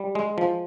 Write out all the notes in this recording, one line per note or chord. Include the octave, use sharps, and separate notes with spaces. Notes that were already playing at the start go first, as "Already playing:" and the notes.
Already playing: G3
G#3
F3